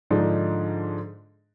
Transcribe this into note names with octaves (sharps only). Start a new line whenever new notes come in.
G#2 D3 F3 D4 D#4